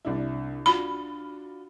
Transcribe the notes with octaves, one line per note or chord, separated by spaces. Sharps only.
C2 D4 E4
D4 F4 F#4 B5